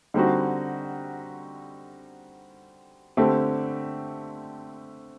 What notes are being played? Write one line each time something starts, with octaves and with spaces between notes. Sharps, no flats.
D3 G3 C4 D#4 F#4
D3 A3 C4 G4